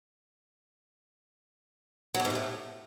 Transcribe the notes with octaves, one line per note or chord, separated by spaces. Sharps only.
F#3
F2
G#2
C3
A2